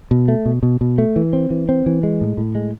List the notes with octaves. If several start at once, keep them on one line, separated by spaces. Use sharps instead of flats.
B2
A3
B2
B2
B2
A3
E3
C4
E3
C4
E3
G#3
A2
A2
G#3